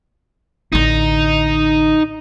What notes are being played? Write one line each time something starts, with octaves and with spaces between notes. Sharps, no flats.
A1 D3 D#4